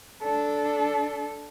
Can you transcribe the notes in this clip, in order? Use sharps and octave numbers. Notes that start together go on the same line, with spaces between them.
D4 A4